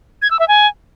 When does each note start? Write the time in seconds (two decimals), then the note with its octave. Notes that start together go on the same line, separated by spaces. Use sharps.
0.22 G#6
0.31 E6
0.39 E5
0.48 G#5